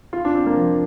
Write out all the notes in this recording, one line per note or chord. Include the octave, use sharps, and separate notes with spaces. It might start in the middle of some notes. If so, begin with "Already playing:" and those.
F4
D4
C4
A#3
F3